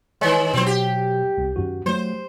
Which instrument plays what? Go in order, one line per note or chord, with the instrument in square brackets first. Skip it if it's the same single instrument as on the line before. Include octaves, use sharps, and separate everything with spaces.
[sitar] D#3 G#3 [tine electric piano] C#5 D#5
[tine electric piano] B2 F#3 [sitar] C4 C5
[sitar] G4
[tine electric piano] C2
F#2 D#3 F#4
[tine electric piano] F#3 A3 [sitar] C5